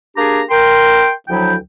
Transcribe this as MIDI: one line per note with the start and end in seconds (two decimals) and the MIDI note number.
0.17 0.42 58
0.17 0.42 62
0.17 0.42 67
0.17 0.42 68
0.17 0.42 82
0.51 1.11 70
0.51 1.11 79
0.51 1.11 84
1.28 1.56 38
1.28 1.56 53
1.28 1.56 54
1.28 1.56 64
1.28 1.56 79